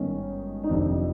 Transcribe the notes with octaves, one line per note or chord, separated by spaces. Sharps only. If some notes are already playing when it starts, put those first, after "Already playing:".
Already playing: G#1 G2 D#3 B3 C#4
D#4
F#1 F2 C3 D#3 C4 D4